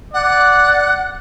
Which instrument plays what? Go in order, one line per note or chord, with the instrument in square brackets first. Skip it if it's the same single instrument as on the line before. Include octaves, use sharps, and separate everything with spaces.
[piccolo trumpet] D5 [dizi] F#5